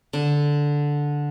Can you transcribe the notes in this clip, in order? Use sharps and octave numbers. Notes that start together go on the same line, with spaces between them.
D3